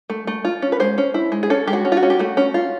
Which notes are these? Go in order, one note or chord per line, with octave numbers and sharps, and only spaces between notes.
A3
A3
F4
C#4
B4
G#3 C5
C#4
E4
G#3
G#4
C#4 A4
G#3 G4
F#4
C#4
F4
F#4
C#4
G4
A3 F#4
C#4
F4